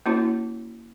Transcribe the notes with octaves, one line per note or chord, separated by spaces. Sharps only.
A#3 C#4 E4 F#4 C#5